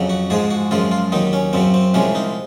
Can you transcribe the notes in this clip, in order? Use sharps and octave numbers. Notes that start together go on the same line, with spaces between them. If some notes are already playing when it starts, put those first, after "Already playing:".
Already playing: F2 C#3 F#3
F#4
G#2 F3 G#3 G#4
F#4
F#2 C#3 F3 G#3 F4
F4
D#2 D#3 F#3 D#4
C#4
F#2 C#3 F#3 C4
C4
C2 C3 F3 G#3 C#4
D#4